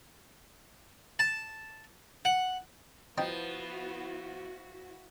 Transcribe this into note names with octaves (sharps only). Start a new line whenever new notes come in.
A5
F#5
F3 B3 D#4 E4 F#4 G5 A5